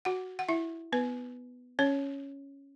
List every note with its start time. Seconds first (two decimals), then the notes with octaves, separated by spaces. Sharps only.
0.05 F#4 F#5
0.39 F#5
0.49 E4 E5
0.92 B3 B4
1.79 C#4 C#5